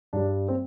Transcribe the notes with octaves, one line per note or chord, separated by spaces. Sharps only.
G2 G3 D4
C4